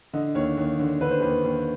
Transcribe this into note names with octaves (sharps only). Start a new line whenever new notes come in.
D3 D#5
D#2 C#5
D#2
D3
D3 B4
C5
D#2 B4
D#2